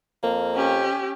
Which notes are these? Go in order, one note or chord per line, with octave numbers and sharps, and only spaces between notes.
F2 A#3
C#4 G4